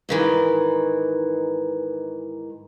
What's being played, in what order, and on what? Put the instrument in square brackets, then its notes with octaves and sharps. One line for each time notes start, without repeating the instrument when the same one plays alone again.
[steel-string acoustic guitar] G#2 D#3 E3